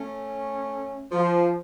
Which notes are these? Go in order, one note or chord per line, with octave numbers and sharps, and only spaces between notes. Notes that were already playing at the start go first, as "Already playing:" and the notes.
Already playing: A3 C#4
F3